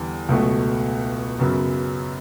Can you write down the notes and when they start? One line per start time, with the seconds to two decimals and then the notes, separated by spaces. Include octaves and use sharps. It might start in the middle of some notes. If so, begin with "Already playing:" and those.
Already playing: E2 D3 G3
0.29 C#2 B2 F#3 A3
1.39 F#2 C#3 F#3 B3